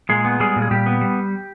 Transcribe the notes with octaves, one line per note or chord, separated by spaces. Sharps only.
A#2 G#3 G#4
B3
G3 G#3 G#4
A#2
G#4
A#2 G3 G4
B3
G3